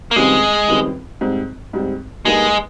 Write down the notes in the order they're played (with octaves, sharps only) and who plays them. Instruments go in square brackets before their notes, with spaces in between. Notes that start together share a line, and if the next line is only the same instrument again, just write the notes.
[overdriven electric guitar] A#3
[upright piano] C#2 C3 D#3 G3 C4 [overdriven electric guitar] G#3
[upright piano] C#2 C3 D#3 G3 C4
G#2 G3 C4
G#2 G3 C4
[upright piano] G2 G3 A#3 D#4 [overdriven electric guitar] G#3